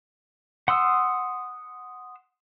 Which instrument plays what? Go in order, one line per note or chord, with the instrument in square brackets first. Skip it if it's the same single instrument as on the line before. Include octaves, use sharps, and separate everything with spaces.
[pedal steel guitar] F#5 C6 D#6 E6